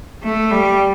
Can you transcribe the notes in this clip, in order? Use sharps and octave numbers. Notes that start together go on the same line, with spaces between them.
A3
G3